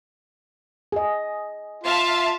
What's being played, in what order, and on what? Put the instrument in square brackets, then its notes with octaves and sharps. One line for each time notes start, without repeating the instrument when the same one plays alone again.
[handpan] G#4 D#5
[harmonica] F4 [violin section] E5 F5 A5